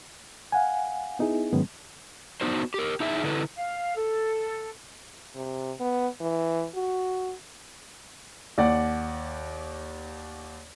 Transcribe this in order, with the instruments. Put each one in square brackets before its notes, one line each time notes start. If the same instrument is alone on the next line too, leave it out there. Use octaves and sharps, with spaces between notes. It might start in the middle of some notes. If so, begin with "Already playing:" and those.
[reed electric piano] F5 F#5 G#5
B3 D#4 E4 G#4
G#2 D#3 F#3 G#3 B3 C#4
[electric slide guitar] B3 D4 D#4 F#4 C5
G4 A#4
D#4 E4 G#4 E5
D3 E4 A4 B4
[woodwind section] F5
A4
[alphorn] C3
B3
E3
F#4
[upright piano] D#2 D5 F#5